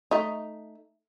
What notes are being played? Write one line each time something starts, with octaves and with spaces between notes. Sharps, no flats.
A3 D#4